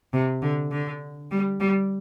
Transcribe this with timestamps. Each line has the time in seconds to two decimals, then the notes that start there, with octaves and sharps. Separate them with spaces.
0.13 C3
0.42 D3
0.72 D3
1.31 G3
1.60 G3